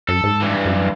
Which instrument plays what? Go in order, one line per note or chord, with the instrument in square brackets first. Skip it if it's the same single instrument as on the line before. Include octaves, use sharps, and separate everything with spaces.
[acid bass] F#2 [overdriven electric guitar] A4
[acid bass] G#2
[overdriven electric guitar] G2 E3
[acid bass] F#2